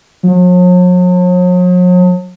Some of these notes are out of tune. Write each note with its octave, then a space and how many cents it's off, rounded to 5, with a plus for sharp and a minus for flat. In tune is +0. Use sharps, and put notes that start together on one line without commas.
F#3 -45